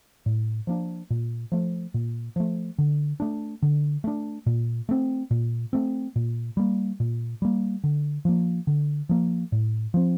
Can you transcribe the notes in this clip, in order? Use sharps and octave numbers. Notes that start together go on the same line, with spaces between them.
A2
F3 A#3 D4
A#2
F3 A3
A#2
F3 A3
D3
A3 D4
D3
A3 D4
A#2
A3 C4
A#2
A3 C4
A#2
G3 A#3
A#2
G3 A#3
D3
F3 A#3
D3
F3 A#3
A2
F3 C4